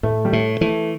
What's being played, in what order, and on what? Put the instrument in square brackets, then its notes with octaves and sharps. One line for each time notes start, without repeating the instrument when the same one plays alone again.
[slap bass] A2 [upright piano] A3
[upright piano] G3
[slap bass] A2 [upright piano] A3
[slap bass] E3 [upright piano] A3